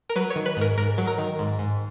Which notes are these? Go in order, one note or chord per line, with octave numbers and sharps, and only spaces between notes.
A#4
F#3 B4
C#5
D#3
B4
G#2 A#4
G#2 A#4
F#3
A#4
D#3
G#2
G#2